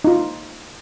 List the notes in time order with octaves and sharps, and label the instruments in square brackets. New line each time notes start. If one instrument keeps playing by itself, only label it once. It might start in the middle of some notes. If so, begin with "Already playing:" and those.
[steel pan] D#4 F4